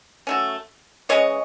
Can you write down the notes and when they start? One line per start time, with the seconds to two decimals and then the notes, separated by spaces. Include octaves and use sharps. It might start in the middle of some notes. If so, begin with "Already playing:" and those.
0.27 F#3 A3 C#4
1.09 E3 G#3 C#4 C#5 D#5